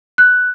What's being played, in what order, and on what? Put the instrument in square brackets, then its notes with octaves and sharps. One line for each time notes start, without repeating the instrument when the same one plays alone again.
[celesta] F#6